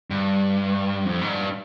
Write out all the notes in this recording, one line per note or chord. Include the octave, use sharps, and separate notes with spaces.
G2
F2
G#2
G2